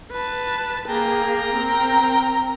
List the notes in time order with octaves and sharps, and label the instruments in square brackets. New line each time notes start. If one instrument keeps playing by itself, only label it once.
[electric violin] B4 A5
[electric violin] A#3 G#4 [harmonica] G5 A#5
[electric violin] C4 A#4